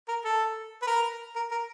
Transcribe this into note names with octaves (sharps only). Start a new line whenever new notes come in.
A#4
A4
B4
A#4
A#4
A#4